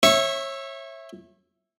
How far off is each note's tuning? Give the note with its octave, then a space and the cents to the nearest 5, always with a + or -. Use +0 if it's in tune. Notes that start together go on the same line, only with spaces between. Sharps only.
C#5 -30 E5 +0 C#6 +0